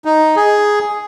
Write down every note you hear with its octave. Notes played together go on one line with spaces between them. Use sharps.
D#4
G#4